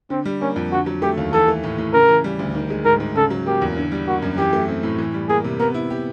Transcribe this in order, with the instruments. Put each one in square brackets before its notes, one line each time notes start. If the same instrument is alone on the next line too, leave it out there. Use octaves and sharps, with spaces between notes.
[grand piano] D3 [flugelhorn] C4
[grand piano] G3
[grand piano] A#3 [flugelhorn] C#4
[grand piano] F2
[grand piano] D3 [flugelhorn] F#4
[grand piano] F#3
[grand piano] A3 [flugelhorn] G4
[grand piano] D#2
[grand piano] E3 [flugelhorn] A4
[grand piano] A3
A2
A2
[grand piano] C#3 [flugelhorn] A#4
[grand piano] E3
G3
D2
D#3
G#3
[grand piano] G#2 [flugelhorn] A#4
[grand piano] G#2
[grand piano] C#3 [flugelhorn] A4
[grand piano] F#3
[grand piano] A#3 [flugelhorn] G4
[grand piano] E2
D3
G3
[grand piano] A#3 [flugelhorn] F#4
[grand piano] F#2
[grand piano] E3 [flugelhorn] G4
[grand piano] A3
C4
A2
E3
G3
[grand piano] A#3 [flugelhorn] G#4
[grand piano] C3
[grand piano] B3 [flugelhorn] A#4
[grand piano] E4
G4